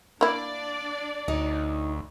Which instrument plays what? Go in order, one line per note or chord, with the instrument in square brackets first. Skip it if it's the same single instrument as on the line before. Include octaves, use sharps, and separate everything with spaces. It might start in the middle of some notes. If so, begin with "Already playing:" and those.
[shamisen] A#3 E4 [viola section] D4 D5
[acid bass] D2 [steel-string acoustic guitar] D#4 C#5